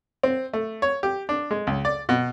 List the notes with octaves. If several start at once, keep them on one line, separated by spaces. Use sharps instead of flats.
C4
A3
C#5
G4
D4
G#3
C#2
D5
B2